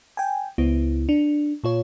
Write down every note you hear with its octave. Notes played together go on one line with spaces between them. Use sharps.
G5 G#5
C#2 B3 E4
D4
A#2 F4 C#5